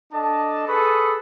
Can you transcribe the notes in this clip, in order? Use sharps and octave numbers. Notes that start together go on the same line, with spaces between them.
D4 A4 D#5 A5
G#4 A4 B4 B5 C#6 D#6